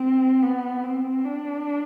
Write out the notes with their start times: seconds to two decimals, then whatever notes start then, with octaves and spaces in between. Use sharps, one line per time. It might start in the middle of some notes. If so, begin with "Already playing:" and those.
Already playing: C4
0.43 B3
0.84 C4
1.25 D4